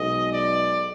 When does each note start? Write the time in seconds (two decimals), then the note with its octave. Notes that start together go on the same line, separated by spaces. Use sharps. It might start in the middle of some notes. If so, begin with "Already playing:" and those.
Already playing: B1 B2 G#3 D#5
0.33 D5